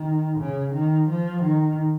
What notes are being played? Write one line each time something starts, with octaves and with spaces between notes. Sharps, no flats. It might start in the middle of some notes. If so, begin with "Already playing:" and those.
Already playing: D#3
C#3
D#3
F3
D#3